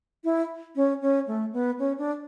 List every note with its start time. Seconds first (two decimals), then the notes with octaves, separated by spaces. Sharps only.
0.24 E4
0.76 C#4
1.02 C#4
1.27 A3
1.53 B3
1.79 C#4
1.98 D4